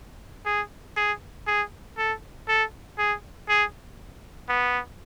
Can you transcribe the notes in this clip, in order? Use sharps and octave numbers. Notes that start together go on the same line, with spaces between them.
G#4
G#4
G#4
A4
A4
G#4
G#4
B3